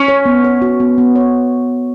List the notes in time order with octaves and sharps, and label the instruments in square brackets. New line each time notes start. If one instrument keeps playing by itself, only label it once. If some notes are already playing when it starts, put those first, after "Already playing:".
Already playing: [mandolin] C#4
[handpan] C#5
B3
C#5
F#4
B3
B3
C#5